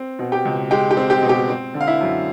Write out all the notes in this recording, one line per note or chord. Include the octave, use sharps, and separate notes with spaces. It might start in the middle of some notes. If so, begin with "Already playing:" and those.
Already playing: C4
B2
G4 G5
C#2
G#3 G4 G5
G4 G5
C4
G4 G5
B2
G4 G5
C4
D3
F5
E4 E5
F#2